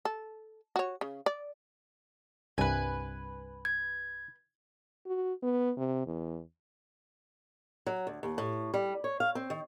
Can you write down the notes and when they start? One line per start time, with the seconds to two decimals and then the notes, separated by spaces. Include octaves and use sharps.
0.05 A4
0.76 F#4 C#5
1.01 C#3
1.26 D5
2.58 C2 G2 B4 G#5
3.65 G#6
5.06 F#4
5.43 B3
5.77 C3
6.06 E2
7.86 F#3
8.07 D2
8.23 D#2
8.38 A2
8.74 G3
9.04 C#5
9.20 F5
9.35 C4
9.50 D#3